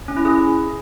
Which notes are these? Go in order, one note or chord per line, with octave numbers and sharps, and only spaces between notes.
C#4
E4
G#4